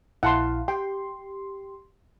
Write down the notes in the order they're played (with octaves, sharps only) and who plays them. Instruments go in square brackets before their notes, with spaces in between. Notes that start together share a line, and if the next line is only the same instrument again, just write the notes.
[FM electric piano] A#1 E4 F5 [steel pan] F#5 A5 C6
[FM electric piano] G4 C6 [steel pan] G5